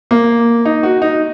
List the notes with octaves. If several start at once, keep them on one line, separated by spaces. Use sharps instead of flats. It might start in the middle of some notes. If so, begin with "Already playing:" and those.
A#3
D#4
F#4
D#4